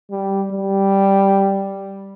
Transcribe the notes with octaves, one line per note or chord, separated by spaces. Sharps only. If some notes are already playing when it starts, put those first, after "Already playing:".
G3
G3